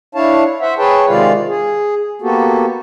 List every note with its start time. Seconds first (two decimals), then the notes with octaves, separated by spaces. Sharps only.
0.15 D4 E4 C#5 F5 A5
0.61 C5 E5 F#5
0.78 G#4 B4 C#5 G5 A5
1.08 C3 D#3 G#3 F4 D5 F5
1.49 G#4
2.22 A#3 B3 F#4 G4 A4